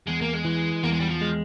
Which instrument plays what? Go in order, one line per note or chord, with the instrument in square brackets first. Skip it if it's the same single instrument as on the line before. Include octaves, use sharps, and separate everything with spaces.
[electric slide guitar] E2 [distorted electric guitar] G#3
[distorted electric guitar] A#3
G#3
[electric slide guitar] E3
[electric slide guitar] E2 [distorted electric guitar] A#3
[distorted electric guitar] G#3
G3
F3
[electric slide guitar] G#3